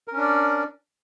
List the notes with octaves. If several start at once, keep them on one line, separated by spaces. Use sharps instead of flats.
C#4 D4 A#4 D5